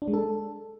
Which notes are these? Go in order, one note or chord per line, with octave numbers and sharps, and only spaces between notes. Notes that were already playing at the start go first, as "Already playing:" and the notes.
D4
G#3
A4